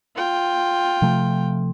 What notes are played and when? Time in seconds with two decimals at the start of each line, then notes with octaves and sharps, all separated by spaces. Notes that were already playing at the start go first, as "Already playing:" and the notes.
0.15 F4 G5
1.02 C3 F3 A3